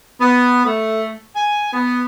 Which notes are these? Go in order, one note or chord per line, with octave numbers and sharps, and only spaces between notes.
B3
A3
G#5
B3